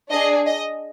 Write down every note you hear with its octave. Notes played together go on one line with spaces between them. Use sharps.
D4 G#4 D#5
D#5